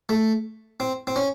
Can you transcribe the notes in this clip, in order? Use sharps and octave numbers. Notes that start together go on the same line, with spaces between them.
A3
C4
C4
C#4